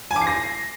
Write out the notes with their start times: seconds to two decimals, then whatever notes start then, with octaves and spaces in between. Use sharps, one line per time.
0.11 G#5
0.16 D6
0.21 C7
0.27 A#6